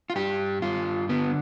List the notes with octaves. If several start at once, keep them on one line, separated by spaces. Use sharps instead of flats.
F4
G2 G4
G2 F4
D3 B3